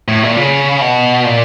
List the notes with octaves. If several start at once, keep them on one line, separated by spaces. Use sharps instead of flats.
A2
A#2
C#3
B2
A#2